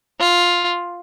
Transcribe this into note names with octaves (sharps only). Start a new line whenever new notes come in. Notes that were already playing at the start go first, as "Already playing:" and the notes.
F4